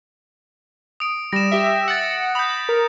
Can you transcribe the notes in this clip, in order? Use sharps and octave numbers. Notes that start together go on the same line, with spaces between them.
D#6 D7
G3 A#6 E7
G4 E5
F#5 A6 C#7
B5 D#6 G6
A#4